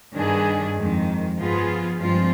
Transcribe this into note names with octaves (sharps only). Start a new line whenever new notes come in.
G2 D#3 B3 D4 G#4
F2 D#3 G#3
G2 F3 B3 F4 G#4
G2 F3 G#3 C4 F4